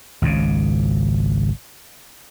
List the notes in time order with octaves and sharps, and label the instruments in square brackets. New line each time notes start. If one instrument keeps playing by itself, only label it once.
[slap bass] G#1 C#2 G#2 C#3